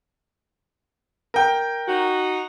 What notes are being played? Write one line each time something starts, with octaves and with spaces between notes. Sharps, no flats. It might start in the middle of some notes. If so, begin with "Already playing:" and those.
A#4 G5
D#4 F#4